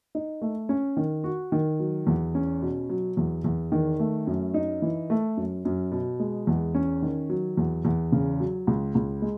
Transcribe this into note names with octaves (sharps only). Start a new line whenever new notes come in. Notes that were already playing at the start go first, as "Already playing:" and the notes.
D#4
A3
C#4
D#3
F#4
D#3
F#3
E2
C#4
B2
F#3
E2
E2
D#3
A3
F#2
D#4
E3
A3
F#2
F#2
B2
G#3
E2
C#4
D#3
F#3
E2
E2
C#3
F#3
C#2
C#2
G#3